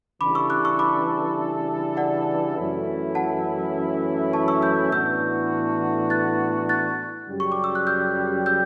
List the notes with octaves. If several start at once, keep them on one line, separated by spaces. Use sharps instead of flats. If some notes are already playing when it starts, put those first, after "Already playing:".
C#3 E3 G3 D4 A4 B5 D6
C#6 E6
D6 F#6
C#6 E6
B5 D6
D5 F#5
F#2 E3 A3 C#4 E4
F#5 A5
A5 C#6
C#6 E6
E6 G6
A2 E3 B3 D4 F#4 E6 G6
F#6 A6
F#6 A6
F#2 C#3 G3
C#6
D6
E6
F#6
E6 G6
E6 G6